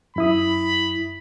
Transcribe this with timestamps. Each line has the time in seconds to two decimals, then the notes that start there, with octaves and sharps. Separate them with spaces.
0.16 F#2 E4 B5 D#6